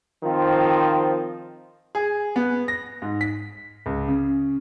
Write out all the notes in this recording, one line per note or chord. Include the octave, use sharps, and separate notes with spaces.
D#3 F3 C4 F4
G#4
B3
A#6
G#2
B6
C#2
C#3